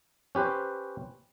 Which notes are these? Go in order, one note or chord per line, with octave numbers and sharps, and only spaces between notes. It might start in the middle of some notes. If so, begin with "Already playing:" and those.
C#4 G4 B4 C5